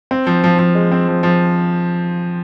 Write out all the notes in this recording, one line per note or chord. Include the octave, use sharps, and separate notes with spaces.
C4
F3
F3
F3
G#3
C4
F3
F3